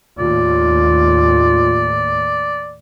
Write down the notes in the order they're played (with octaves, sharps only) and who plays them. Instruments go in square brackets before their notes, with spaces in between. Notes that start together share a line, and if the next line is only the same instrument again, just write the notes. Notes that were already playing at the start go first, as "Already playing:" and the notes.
[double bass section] D#2 A2 [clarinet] F4 [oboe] D5